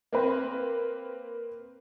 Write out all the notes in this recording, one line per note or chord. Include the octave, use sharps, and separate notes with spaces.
A#3 C4 B4